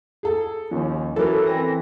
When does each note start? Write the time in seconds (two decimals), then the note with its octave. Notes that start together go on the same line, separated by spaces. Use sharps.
0.23 G#4 A4
0.71 D#2 F3 C#4
1.16 E3 F#3 A4 A#4
1.47 C4 A#6